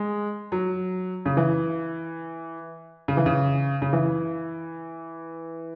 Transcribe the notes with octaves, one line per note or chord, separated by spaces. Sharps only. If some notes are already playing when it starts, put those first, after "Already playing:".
Already playing: G#3
F#3
C#3
E3
C#3
E3
C#3
C#3
E3